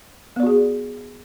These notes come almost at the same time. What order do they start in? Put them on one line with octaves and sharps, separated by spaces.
B3 D5 F#4 G#4